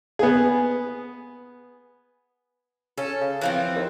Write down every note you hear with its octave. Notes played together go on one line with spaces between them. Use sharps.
B3 G#4
C#4 A4
C#3
E3 F3 C4
D#2